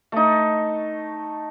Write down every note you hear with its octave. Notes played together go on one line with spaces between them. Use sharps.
A3 D#4